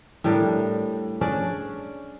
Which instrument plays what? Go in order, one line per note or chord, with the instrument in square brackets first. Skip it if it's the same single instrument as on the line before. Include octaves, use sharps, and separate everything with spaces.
[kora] A2 G3 D4 A#4
C#4 D4 G#4 D5